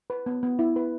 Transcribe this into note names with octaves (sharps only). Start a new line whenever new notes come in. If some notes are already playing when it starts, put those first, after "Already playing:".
B4
B3
B3
E4
B4